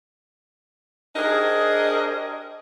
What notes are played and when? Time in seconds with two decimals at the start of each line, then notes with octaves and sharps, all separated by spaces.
1.16 D4 G4 G#4 A#4 C5 D#5